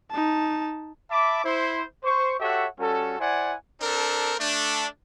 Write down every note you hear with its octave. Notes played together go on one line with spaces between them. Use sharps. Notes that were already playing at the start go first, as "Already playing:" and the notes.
D#4 A5
E5 A5 B5 D6
E4 C5 C6
C5 C#6
F#4 G4 A4 C#5 E5 F#5
G3 C#4 F#4 A4
E4 C5 D5 F#5 G#5
C4 D4 A4 A#4
A3 D4